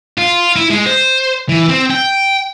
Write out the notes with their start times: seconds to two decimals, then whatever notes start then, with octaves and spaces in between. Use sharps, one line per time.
0.18 F4
0.56 E4
0.71 G#3
0.86 C5
1.49 E3
1.69 C4
1.91 G5